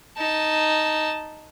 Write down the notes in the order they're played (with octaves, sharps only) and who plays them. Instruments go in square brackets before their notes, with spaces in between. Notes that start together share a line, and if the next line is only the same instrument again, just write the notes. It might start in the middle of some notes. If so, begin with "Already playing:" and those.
[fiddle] D#4 A5